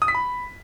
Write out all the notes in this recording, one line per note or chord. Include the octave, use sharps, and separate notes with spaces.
D#6
B6
B5